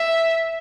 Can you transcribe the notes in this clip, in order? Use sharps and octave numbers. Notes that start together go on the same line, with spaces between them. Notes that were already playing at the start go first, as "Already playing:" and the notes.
Already playing: E5